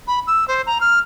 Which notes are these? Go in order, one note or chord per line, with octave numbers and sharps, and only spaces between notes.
B5
E6
C5
A#5
F6